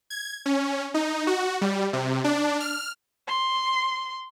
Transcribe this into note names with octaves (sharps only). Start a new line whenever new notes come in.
G#6
C#4
D#4
F#4
G3
C3
D4
F6
C6